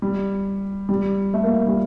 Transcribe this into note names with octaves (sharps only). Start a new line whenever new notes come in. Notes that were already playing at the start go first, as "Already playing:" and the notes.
G3
G3
A3
A#3
A3
G3